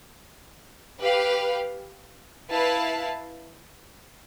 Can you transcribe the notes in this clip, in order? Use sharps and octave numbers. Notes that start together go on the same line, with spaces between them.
G4 B4 F5
E4 B4 F5 A5